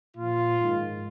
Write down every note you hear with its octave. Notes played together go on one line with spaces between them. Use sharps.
A#2 F3 F4
G#2 D#3